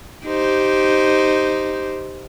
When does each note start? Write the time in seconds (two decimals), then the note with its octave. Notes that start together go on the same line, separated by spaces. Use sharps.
0.25 D#4 G4 C5